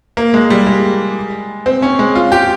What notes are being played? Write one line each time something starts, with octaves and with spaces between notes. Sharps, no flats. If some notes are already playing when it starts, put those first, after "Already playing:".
A#3
G#3
G3
G#3
C4
C#4
G#3
F4
G4